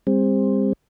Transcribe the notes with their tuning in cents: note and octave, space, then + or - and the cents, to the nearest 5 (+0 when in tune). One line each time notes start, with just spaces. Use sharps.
G3 +45 C4 +10